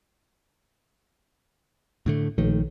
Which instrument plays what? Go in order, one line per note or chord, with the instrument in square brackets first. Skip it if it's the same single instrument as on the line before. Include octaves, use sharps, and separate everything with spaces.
[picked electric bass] A2 D3 A3
[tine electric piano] A#1 [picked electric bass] D#3 A3